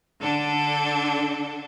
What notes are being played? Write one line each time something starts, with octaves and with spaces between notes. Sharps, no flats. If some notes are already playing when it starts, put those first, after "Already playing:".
D3 D4 A4